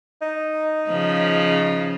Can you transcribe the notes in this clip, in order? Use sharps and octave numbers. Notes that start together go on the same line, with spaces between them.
D#4
C#3 F3